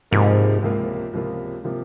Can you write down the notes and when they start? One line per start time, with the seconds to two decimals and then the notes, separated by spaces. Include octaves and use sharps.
0.11 C#2 G#2 C3 F3 A#3 F4
0.62 C#2 C3 F3 A#3 F4
1.13 C#2 C3 F3 A#3 F4
1.64 C3 F3 A#3 F4